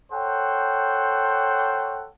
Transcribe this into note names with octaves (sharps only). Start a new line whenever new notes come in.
A4 C5 C#5 F#5 G5